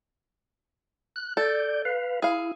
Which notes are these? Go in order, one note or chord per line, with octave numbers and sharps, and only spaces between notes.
F#6
A4 D5 G6
B4 F5
E4 G#4 F5